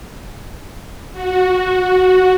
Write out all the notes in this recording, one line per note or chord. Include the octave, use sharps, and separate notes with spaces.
F#4